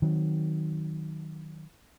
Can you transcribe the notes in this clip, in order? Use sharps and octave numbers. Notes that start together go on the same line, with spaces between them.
D#3 F#3 C4